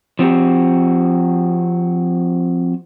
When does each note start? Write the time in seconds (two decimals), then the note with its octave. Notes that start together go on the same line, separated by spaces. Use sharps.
0.19 F3 C4 F#4 G4